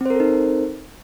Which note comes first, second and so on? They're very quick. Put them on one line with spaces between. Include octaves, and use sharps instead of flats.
C4 C5 A#4 A4 D#4